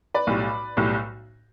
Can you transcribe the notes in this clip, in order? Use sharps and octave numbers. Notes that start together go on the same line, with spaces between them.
B4 D5
B1 A2 G3
B1 A2 G3